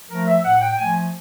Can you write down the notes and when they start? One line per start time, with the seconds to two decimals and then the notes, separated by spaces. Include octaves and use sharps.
0.10 F3 A3 A#4
0.28 E5
0.44 A2 F#5
0.61 G5
0.78 F3 A3 G#5